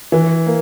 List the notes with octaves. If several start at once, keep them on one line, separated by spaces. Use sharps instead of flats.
E3
A#3